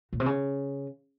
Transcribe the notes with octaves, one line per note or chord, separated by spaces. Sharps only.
A#2
C3
C#3